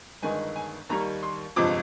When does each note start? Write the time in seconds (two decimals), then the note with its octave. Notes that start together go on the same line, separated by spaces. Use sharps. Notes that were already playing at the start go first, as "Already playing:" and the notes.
0.22 G1 G2 D#3 G#3 G#5
0.56 G#5
0.89 D#2 D#3 G3 A#3 A#5
1.23 C6
1.56 G1 F2 C3 F3 G#3 D6